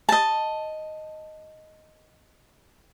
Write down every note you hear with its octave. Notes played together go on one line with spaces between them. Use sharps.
D#5 A5